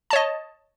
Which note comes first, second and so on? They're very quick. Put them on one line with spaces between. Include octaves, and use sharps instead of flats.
A5 C#5 D#5